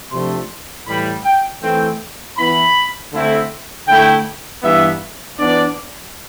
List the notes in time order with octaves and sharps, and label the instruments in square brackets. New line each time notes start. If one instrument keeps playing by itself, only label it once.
[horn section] C3 F3 A3 D4 C6
A2 E3 G3 B5
G5
E3 A3 C4 E4 G5
E3 B3 E4 B5
D3 A3 C4 E4
D3 A3 E4 G5
G2 E3 B3 E5
E3 B3 D4 D5